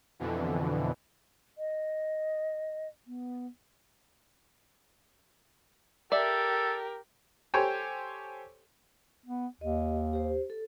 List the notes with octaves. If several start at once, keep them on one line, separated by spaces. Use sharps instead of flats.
F2 B2 D3 E3
D#5
B3
G4 A4 A#4 D5 E5
G4 A4 C5 C#5 G5 G#5
B3
D#2 G4 D#5
G4 C5
A4